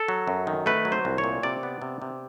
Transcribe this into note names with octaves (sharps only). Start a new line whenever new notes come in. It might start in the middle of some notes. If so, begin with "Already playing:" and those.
Already playing: A4
F#3
F#2
D#3
A3 B4
F#3
C5
C2
C#5
A#2
C3 D5
B3
C3
C3